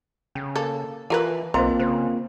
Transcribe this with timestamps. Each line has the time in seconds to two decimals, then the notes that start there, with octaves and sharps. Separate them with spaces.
0.35 C#3 C#4
0.55 A#3 A4
1.10 E3 F4 A#4 B4 A5
1.54 B1 A#3 C4 F4 C5 D#5 A#5 C6
1.80 C#3 C5